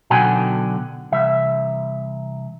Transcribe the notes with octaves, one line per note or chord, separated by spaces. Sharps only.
B1 B2 D3 F#4 G5 G#5
C2 E3 E5